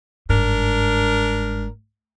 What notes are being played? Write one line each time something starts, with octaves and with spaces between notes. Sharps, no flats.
G1 G#2 D4 A#4